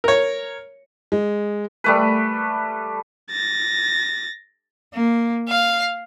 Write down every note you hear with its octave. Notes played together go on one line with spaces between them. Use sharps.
A#4 C#5
G#3
G3 A3 B4
A6 A#6
A#3
F5